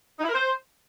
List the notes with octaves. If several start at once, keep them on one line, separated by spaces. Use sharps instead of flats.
D#4
E4
A#4
C5